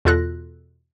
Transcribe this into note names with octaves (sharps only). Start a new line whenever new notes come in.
E2 B2 F4 A4 F#6 A#6